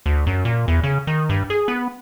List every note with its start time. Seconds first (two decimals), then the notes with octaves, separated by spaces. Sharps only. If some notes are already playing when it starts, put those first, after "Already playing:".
0.06 D2
0.27 F#2
0.45 A#2
0.68 E2
0.83 C#3
1.07 D#3
1.29 G2
1.50 G#4
1.68 B3